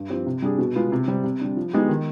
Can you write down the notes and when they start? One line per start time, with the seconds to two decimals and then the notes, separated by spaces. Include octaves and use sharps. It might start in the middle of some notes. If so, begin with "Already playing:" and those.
Already playing: G2
0.10 F3 C4 G4
0.26 C3
0.42 G3 D4 G#4
0.58 B2
0.76 G#3 B3 F4 B4
0.92 C3
1.07 G3 C4 G4
1.24 C3
1.41 G3 D4
1.57 F3
1.73 G#3 B3 D#4 G4
1.89 D#3